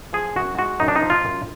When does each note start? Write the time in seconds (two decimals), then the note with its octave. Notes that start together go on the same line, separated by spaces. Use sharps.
0.13 F3 G#4
0.36 F#2 F#4
0.57 G#3 F#4
0.80 F#2 D#4
0.88 D4
0.96 D#4
1.02 F3
1.10 F4
1.25 F#2